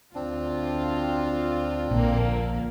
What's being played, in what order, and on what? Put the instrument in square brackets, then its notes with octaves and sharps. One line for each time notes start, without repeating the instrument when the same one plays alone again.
[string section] D2 F4 [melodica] C4 D4
[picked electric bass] A#1 [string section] A#2 D3 A#3